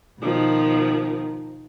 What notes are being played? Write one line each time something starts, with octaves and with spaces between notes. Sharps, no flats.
B2 D#3 F3